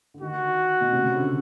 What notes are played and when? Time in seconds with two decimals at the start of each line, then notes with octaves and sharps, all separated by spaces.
0.14 D3
0.21 D#3 F#4
0.81 B2
0.93 C3
1.05 C#3
1.16 D3